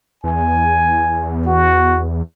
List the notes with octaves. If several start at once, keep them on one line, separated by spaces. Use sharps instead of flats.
E2 G#5
F#4